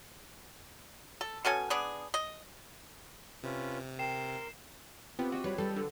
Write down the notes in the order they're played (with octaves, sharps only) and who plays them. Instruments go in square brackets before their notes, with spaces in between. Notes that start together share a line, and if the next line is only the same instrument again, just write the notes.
[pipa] A4
B2 C#4 A4 G#5
B3 D4 G#4
D#5
[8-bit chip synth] C3 [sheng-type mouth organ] C#4 F4 B4
[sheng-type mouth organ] A#4 C6 [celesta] G5 [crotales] C7 E7
[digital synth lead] B3 [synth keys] C4 [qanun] F4 G4
[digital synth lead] F#4 [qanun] C5 D#5 G5
[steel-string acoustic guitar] G3 [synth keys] B4 C#5 B5
[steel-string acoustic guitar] G3 [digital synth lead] A4
[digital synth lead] D3 [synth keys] A4